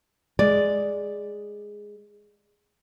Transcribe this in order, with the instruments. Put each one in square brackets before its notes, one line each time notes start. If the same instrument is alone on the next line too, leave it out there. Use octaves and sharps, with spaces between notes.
[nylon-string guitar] G#3 [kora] D5